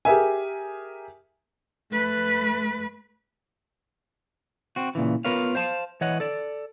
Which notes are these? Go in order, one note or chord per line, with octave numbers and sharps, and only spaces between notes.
G4 G#4 A#4 E5 G#5
A3 B4
C4 F#4
A#2 C#3 E3
B3 F4 A#4 B4 C#5 F5
C5 F5 A5
E3 C#5 D#5 F#5
A4 D5